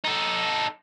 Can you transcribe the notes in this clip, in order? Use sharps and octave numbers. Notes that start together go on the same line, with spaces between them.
D#4 A4